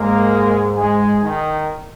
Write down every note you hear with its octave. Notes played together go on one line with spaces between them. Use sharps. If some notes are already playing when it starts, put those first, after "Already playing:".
Already playing: G#2 G#3 A#3 A#4
G#3 G#4
D#3 D#4